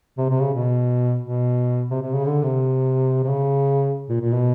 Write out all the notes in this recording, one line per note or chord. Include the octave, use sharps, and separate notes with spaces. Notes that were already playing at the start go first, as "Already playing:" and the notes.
C3
C3
C#3
B2
B2
C3
C3
C#3
D3
C3
C3
C#3
A#2
A#2
B2